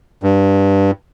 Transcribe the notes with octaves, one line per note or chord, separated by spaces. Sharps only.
G2